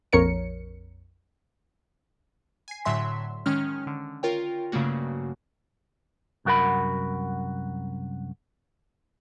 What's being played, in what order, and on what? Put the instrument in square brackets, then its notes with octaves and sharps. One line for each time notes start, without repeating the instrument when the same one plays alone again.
[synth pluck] A#1 F2 A#4 C#5 C#7
[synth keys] G#5 C7
A2 D3 F#3 E5 C6 B6
D#3 G#3 C#4 F6
D3
F4 A#4 C#5 G5
G2 C#3 F#3 A3 A#3 F#4
[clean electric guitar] C2 F#2 F#4 A#4 F#5 B5